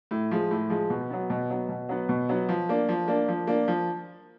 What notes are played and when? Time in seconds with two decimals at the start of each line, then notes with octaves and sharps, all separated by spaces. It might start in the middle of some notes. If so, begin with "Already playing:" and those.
0.11 A2
0.31 F3 G#3
0.51 A2
0.70 F3 G#3
0.90 B2
1.10 F#3 B3
1.30 B2
1.50 F#3 B3
1.69 B2
1.89 F#3 B3
2.09 B2
2.29 F#3 B3
2.49 F3
2.69 A#3 D4
2.89 F3
3.08 A#3 D4
3.28 F3
3.47 A#3 D4
3.68 F3